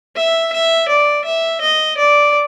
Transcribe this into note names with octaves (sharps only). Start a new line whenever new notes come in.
E5
E5
D5
E5
D#5
D5